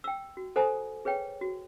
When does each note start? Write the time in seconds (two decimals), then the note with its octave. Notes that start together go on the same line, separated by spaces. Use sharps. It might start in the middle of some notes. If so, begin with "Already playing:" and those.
0.04 G5 E6
0.37 F#4
0.56 A4 C5 F#5 G#5 A#5 D#6
1.05 G#4 B4 C#5 G5
1.41 F#4